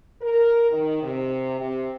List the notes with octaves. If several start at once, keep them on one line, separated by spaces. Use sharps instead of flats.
A#4
D#3
C3
C3